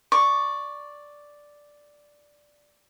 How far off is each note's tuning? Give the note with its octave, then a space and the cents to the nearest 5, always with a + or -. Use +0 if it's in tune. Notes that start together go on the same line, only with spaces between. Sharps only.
D5 +0 C#6 +0